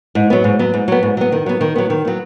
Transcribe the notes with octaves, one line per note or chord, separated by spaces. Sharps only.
G#2
F#3 B3
G#2
F#3 B3
G#2
F#3 B3
G#2
F#3 B3
D#3
F#3 B3
D#3
F#3 B3
D#3
F#3 B3